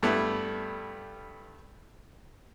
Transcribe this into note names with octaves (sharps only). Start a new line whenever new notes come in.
G2 G3 A3 B3 E4